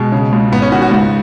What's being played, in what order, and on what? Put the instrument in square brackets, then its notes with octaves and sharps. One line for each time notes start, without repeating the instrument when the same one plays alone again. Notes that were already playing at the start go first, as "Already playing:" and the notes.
Already playing: [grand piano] B2 G#3
C#3
C#2
G#1 B3
C#4
D#3 F#4
F#4
C#2